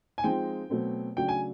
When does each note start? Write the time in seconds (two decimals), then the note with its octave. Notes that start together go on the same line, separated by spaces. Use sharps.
0.18 G#5
0.24 F3 G#3 C4 D#4 G5
0.70 B2 F#3 A3 C4
1.17 C#3 F#3 A3 D4 F#4 G5
1.28 G#5